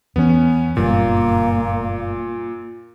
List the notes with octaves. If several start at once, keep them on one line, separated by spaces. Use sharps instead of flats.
E2 E3 B3 C#4
F#1 G2 A#2 A#3